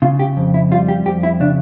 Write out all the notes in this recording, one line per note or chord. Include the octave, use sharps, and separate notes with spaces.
C#3 F4
G4
F2
E4
G3 F4
G4
F2 G4
E4
C#3 D4